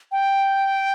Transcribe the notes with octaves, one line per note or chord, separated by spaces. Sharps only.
G5